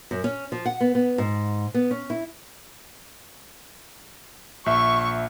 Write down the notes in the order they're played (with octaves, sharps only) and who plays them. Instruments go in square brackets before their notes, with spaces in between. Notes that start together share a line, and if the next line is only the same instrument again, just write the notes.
[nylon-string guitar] F#2
C#4
F3
F#5
B3
B3
G#2
B3
C#4
E4
[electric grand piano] A#1 E5 [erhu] C#6